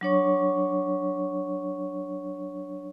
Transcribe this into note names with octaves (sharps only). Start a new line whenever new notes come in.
F#3 D4 C#5 C#6